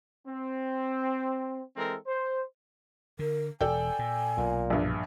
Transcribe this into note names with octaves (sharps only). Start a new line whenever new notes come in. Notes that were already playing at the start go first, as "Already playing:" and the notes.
C4
E3 G#3 C4 A4 A#4
C5
D3 A#4
E1 A4 D5 G5 G#5
A#2
B1 A#2
A#1 G2